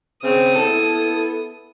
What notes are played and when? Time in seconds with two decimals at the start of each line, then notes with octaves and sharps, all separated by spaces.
0.24 C#3 C4 D#6
0.56 B3 E4 A4